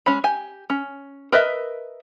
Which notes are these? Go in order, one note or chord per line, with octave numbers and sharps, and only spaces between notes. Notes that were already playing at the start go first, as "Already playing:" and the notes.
G#3 C#4 C#5 B5
G4 G#5
C#4
A#4 B4 D#5 E5